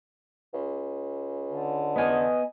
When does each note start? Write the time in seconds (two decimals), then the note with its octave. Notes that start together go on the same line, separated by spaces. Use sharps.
0.53 C#2
1.50 D3
1.96 B3 D#5 G#5